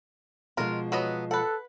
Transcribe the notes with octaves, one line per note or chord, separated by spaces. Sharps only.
B2 F3 G#3 F4 A#4
F#3 B3 D#5
A4 B4 F#5